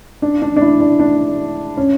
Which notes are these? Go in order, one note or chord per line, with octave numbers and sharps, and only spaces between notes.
D4
D4
D4
E4
D4
D4
C#4